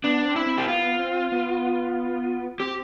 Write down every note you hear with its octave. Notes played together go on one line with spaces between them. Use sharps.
B3 D4
C4
E4
C4
G4
B3 F4
C4
B3
C4 G4